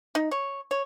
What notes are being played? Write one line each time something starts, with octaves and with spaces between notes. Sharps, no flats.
D#4
C#5
C#5